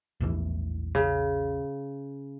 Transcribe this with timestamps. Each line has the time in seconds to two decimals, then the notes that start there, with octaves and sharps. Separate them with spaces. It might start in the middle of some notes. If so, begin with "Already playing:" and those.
0.20 A#1 E2 E3
0.95 C#3